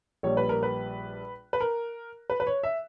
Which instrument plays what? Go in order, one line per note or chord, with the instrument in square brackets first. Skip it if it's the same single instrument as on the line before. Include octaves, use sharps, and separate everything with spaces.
[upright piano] A#1 A#2 G3 C#5
B4
A#4
B4
B4
A#4
B4
B4
C#5
E5